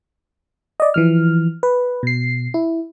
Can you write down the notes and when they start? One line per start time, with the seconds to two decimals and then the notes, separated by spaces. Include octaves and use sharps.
0.80 D5 D#5
0.94 E3 F3 F6
1.63 B4
2.03 B2 C7
2.54 E4